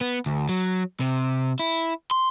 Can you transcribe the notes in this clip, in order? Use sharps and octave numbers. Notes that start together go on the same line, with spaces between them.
B3
D2
F#3
C3
E4
C6